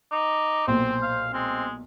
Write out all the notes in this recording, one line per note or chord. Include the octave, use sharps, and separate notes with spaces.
D#4 D6
B1 A#2 C4 C5
F5
G#3 C4